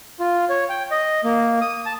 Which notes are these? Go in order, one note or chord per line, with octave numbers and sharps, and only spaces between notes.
F4
C#5
G5
D#5
A#3
D#6
A5